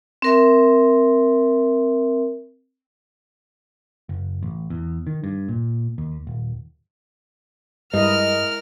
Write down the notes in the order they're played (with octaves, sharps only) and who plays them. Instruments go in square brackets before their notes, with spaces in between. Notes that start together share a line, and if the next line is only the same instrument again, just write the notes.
[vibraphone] C4 A#4 E5
[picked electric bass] F#1
A1
E2
D#3
G2
A#2
D#2
D#1
[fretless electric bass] G2 [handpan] G#3 E4 D#5 [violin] A#4 F6